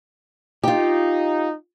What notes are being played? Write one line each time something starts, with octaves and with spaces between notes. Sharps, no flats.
D#4 F4 G4